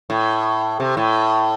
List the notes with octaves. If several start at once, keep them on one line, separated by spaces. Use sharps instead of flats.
A2
C3
A2